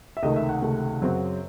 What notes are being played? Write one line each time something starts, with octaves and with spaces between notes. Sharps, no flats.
E5
C#2 C3 D#3 A3 D#5
E5
F#5
C#2 C3 D#3 A3
F#2 C#3 F#3 C4